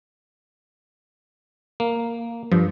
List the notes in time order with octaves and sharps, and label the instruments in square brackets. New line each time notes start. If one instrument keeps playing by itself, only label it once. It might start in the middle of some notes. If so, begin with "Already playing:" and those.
[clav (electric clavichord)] A#3
[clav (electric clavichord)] G2 [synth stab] F3